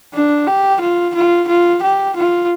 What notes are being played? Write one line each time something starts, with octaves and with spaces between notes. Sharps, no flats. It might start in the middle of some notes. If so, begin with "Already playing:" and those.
D4
G4
F4
F4
F4
G4
F4